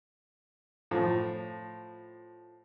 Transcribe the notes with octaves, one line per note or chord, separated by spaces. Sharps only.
A2 F3